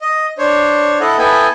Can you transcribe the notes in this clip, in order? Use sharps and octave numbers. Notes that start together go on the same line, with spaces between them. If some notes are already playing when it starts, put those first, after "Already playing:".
D#5
D4 C5 C#5
E4 A4 D#5 F#5
B3 E4 A4 B4 G5 G#5